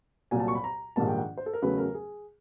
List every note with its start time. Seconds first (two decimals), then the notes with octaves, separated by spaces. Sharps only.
0.31 C2 A#2 F#3 G#5
0.40 A5
0.48 C#6
0.55 B5
0.64 A#5
0.96 A#1 G#2 D#3 G3 A#3 A5
1.08 G5
1.18 F#5
1.37 C5
1.46 A4
1.53 A#4
1.62 E2 C#3 F#3 A3 B4
1.78 A#4
1.94 G#4